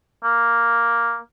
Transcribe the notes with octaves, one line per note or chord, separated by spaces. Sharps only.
A#3